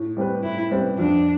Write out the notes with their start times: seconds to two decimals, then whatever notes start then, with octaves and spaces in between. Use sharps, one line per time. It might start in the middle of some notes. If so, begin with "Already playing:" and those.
Already playing: A2
0.17 G3 C4 G4 B4
0.43 A2 E4
0.71 G3 C4 G4 B4
0.98 F2 D4